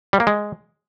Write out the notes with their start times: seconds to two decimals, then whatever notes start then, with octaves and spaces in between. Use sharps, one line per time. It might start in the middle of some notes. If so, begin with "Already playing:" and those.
0.13 G3
0.20 A#3
0.27 G#3